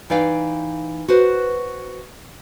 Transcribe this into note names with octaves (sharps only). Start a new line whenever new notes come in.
E3 D#4 D5 F5 G5
F#4 B4 C5